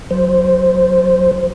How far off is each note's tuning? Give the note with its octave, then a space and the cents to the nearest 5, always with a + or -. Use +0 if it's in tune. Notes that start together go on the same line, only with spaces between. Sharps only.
F#3 -10 C5 +0